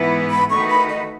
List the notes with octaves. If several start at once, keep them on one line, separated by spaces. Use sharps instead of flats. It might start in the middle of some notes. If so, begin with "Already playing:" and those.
Already playing: G#2 E3 B3 E4 B4
B5
D#3 A3 D#4 F#4 B4 C#6
B5
D#5